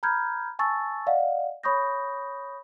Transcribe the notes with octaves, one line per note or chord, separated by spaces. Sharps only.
A#5 B5 F6 G6 G#6
G#5 A5 C#6 E6 A6
D5 D#5 F5 F#5
C#5 B5 C#6 D#6 G6 A#6